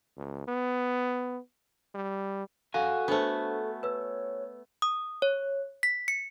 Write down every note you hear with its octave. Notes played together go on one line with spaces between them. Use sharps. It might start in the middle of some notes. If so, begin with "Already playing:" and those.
C#2
B3
G3
F#4 A4 F5 G#5
A3 B3 D4 C5
B4 C#5 E6
D#6
C#5
B6
C#7